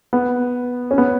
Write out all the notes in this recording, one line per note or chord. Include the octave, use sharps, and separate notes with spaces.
B3
C#4
B3